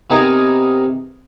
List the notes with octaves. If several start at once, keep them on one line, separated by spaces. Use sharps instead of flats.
C3 B3 D#4 G#4 A#4 G#5